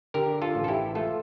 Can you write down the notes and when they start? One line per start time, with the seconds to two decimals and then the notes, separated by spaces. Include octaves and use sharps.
0.14 D3 G4 A#4
0.42 F4 A4
0.55 A1
0.64 A4
0.68 E4 G4
0.95 A3 F4 A4